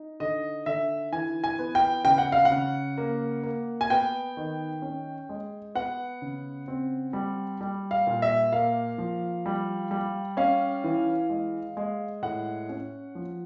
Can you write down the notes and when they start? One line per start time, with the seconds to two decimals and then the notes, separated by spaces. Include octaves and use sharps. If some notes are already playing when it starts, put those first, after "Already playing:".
Already playing: D#4
0.20 D3 D#5
0.66 D3 E5
1.13 E3 G#5
1.44 G#5
1.59 B3
1.75 G5
2.05 C#3 G5
2.18 F#5
2.32 F5
2.45 F#5
2.52 C#3
2.98 A#3
3.43 A#3
3.81 G#5
3.90 B3 G5
4.37 D#3
4.82 C#4
5.29 G#3
5.75 B3 F#5
6.22 C#3
6.68 C4
7.13 G3
7.61 G3
7.91 F5
8.07 A#2
8.22 E5
8.52 A#3 F5
8.98 F3
9.46 G3
9.91 G3
10.37 C#4 F5
10.84 E3
11.29 G#3
11.77 G#3
12.22 A2 F#5
12.69 C#4
13.15 F3